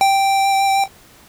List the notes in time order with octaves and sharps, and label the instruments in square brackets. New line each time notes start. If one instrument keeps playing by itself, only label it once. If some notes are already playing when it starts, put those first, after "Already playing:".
[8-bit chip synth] G5